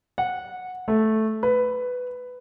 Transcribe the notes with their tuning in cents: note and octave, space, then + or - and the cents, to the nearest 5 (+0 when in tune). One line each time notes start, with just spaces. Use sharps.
F#5 -15
A3 -5
B4 +10